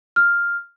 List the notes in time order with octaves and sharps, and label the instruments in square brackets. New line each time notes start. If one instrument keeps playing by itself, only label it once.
[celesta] F6